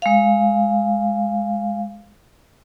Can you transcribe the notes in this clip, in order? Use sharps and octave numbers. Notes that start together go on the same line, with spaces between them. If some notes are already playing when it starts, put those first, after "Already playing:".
G#3 F5